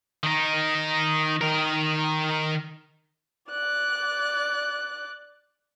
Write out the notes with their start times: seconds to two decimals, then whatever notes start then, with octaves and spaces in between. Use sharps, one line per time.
0.23 D#3 D#4
1.41 D#3 A#4
3.50 D5 F#6